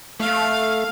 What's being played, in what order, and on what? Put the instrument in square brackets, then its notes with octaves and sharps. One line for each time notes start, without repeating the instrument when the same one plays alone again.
[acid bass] A3 [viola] F5